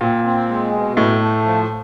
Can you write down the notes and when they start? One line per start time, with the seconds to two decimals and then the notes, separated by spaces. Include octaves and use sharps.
0.01 A#2 C4
0.24 C4
0.48 G#3
0.73 B2
0.97 A2 A3
1.20 A3
1.45 F3